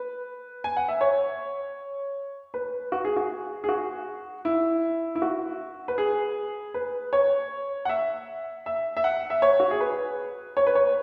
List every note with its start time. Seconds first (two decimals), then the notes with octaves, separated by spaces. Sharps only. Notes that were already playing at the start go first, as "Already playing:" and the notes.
Already playing: B4
0.64 G#5
0.77 F#5
0.88 E5
1.01 C#5
2.54 B4
2.92 F#4
3.05 G#4
3.16 F#4
3.64 G#4
3.69 F#4
4.45 E4
5.15 E4
5.22 F#4
5.88 B4
5.98 G#4
6.74 B4
7.13 C#5
7.85 F#5
7.89 E5
8.66 E5
8.97 E5
9.04 F#5
9.30 E5
9.42 C#5
9.60 F#4
9.71 G#4
9.80 B4
10.57 C#5
10.67 B4
10.75 C#5